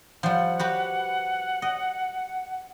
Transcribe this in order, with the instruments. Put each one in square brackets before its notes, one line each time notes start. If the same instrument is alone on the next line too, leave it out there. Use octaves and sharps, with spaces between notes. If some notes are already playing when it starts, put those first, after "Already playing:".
[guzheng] F3 G3 [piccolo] F#5
[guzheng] F#4 G4 B4
D#5